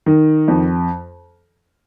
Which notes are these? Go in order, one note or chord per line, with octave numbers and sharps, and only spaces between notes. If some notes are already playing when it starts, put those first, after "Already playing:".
D#3
F2